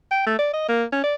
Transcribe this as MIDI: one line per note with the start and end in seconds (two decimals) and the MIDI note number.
0.11 0.26 79
0.26 0.36 57
0.39 0.52 74
0.53 0.65 75
0.69 0.84 58
0.92 1.02 61
1.03 1.15 74